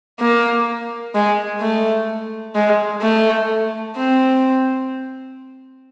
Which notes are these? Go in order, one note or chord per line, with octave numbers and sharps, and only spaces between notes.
A#3
G#3
A3
G#3
A3
C4